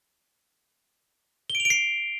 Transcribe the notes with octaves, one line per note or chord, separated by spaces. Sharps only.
G7
D7
F7
D7
C7